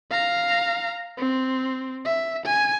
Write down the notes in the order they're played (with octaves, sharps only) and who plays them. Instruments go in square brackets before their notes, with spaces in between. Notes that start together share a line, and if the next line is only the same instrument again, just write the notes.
[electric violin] F5 A#5
C4
E5
G#5